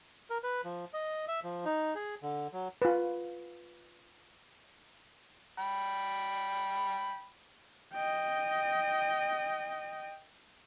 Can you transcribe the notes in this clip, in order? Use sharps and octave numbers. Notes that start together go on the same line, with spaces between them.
A#4
B4
F3
D#5
E5
F3
D#4
G#4
D3
F#3
F4 B4
G5 B5
D#5 G5